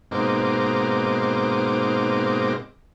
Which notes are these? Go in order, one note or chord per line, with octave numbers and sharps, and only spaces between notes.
G#2 B2 A#3 C4 D#4 D6